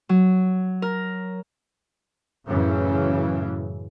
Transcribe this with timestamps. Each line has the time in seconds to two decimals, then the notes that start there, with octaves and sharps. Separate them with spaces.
0.09 F#3
0.82 A#4
2.47 F#2 A2 C#3 E3